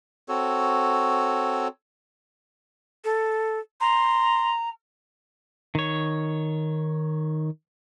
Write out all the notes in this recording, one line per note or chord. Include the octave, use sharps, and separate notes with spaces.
C4 F#4 A4 C#5
A4
A#5 C6
D#3 C#5